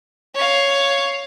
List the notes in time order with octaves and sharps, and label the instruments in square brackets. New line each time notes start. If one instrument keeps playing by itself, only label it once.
[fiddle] C#5 F5